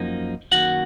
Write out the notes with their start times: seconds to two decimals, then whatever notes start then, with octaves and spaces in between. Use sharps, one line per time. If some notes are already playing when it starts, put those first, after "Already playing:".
Already playing: F#2 F3 A#3 D#4
0.52 F#2 D#3 A#3 F#4 F#5